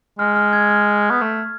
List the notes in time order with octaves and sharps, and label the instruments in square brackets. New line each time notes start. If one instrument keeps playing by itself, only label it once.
[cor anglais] G#3 [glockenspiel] F6
[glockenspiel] F6
G#6
F6
[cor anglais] B3
A3